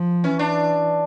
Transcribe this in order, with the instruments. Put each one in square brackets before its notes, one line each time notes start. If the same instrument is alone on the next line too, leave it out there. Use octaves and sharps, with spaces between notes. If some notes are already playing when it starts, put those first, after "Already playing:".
Already playing: [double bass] F3
[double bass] E3 [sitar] C#4
[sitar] D4